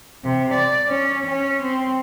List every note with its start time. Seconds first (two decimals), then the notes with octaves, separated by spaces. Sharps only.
0.24 C3
0.53 D5
0.88 C#4
1.25 C#4
1.61 C4